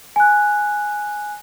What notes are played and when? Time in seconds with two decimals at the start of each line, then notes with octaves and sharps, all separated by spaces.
0.16 G#5 F#6